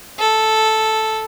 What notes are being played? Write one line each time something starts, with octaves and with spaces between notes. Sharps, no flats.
A4